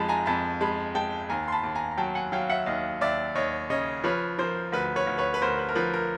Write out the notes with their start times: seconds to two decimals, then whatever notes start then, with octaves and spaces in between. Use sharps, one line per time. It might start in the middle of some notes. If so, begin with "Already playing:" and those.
Already playing: F2 F3 G#3 A5 B5
0.09 G#5 A#5
0.26 F2 A5 B5
0.60 G#3 A5 B5
0.95 G#3 G5 A5
1.29 D#2 G#5 A#5
1.48 C6
1.52 A5 B5
1.63 D#2
1.75 G#5 A#5
1.91 A#5
1.98 F#3 G5 A5
2.15 F#5 G#5
2.32 F#3 F5 G5
2.49 E5 F#5
2.66 D#2 D#5 F5
3.01 D#2 D5 E5
3.35 D#2 C#5 D#5
3.70 C#3 C#5 D#5
4.04 F3 B4 C#5
4.38 F3 A#4 C5
4.72 D2 B4
4.96 B4 C#5
5.07 D2
5.18 B4 C#5
5.34 B4
5.42 D2 A#4 C5
5.59 B4
5.69 A#4
5.75 F3 B4
5.94 A#4